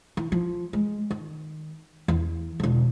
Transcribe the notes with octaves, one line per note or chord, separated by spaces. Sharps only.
E3
F3
G#3
D#3
E2
E1 D3